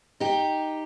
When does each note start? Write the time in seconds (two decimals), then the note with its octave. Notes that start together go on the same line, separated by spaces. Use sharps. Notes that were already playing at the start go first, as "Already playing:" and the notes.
0.20 D#4 G4